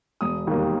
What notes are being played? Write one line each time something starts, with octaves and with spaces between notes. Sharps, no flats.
E1 D#6
D#2 D#3 G3 A#3